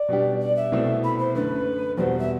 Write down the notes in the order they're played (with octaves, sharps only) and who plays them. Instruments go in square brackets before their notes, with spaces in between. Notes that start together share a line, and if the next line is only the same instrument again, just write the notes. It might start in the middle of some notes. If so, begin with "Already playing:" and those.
Already playing: [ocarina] D5
[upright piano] B2 G3 D4 G4
[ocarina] D5
E5
[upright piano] C2 B2 A3 C4
[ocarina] B5
C5
[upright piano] F#2 D3 A3 [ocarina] B4
[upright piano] E2 B2 G3 C4 F#4 [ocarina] C5
[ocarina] E5